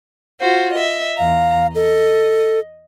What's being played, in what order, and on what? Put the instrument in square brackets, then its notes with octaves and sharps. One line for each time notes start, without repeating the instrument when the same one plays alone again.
[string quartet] F4 F#4 C5
D#5 E5
[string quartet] E2 A#5 [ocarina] F5
[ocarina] A4 [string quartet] D#5